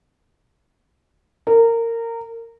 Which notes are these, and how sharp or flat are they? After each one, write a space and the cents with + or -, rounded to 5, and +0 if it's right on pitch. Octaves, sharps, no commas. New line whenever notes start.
A#4 -20